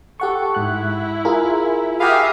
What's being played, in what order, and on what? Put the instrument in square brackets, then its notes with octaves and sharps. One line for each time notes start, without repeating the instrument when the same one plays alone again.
[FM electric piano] G4 F#5 C#6 [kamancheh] A4
[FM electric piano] G#2 F#6 [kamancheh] E4
[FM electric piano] F4 G#4 A#4
[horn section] F#4 G4 F5 [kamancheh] E5 D#6 [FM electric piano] G#5 B5